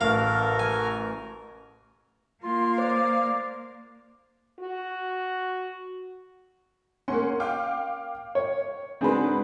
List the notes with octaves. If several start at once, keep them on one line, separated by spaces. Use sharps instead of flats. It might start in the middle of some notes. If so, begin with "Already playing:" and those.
A1 F#4 A4 A#4 F5 F6
G#5
A#3 F4 F5 C6
C5 D5 D6
F#4
A#3 C#4 F#5 C6
F5 G5 D6
C#5
G#2 C4 D4 F#4 G#4 B4